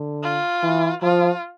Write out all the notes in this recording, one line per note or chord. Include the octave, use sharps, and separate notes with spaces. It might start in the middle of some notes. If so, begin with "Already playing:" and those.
Already playing: D3
F4
E3
F3 F4